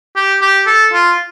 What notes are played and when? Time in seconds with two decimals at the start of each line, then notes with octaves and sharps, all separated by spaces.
0.16 G4
0.42 G4
0.67 A4
0.93 F4